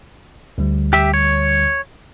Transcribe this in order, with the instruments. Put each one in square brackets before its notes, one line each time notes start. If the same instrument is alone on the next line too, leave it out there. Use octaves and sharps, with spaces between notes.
[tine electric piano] D2 D3 G3
[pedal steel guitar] G4 E5
C#5